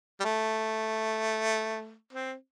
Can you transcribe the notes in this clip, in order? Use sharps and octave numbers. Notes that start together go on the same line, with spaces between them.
G3
A3
C4